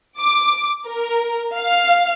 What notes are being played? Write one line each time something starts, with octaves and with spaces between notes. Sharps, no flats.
D6
A#4
F5